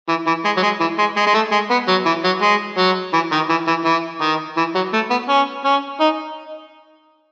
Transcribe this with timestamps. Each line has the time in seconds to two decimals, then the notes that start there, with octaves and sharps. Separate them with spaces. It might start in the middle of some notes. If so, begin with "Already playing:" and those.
0.08 E3
0.27 E3
0.44 G#3
0.57 F#3
0.63 G#3
0.80 E3
0.98 G#3
1.16 G#3
1.27 G#3
1.34 A3
1.52 G#3
1.70 B3
1.88 F#3
2.06 E3
2.24 F#3
2.42 G#3
2.78 F#3
3.13 E3
3.32 D#3
3.50 E3
3.67 E3
3.85 E3
4.21 D#3
4.57 E3
4.75 F#3
4.93 A3
5.10 B3
5.29 C#4
5.65 C#4
6.00 D#4